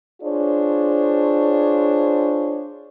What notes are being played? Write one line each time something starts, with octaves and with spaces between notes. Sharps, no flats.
D4 F4 G#4 C5 C#5